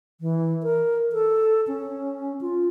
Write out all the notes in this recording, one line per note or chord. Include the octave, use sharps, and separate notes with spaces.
E3
A#4
A4
C#4
F4